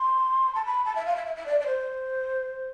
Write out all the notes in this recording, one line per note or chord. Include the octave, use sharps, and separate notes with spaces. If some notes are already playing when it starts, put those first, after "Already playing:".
Already playing: C6
A5
B5
A5
E5
F5
E5
E5
E5
D5
D5
C5